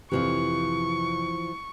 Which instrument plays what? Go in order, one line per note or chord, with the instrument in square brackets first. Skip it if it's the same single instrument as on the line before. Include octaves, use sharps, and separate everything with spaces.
[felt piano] F2 C3 [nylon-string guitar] E3 F3 F4 [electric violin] C#6